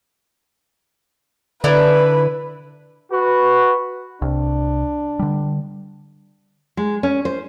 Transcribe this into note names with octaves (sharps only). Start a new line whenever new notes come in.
D3 D4 E4 B4 A#5
F#4 B4
C2 D4
D3 G3
G#3
C#4
C5